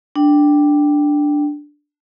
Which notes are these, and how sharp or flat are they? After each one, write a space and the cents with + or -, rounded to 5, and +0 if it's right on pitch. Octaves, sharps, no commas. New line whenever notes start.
D4 +0 G5 +0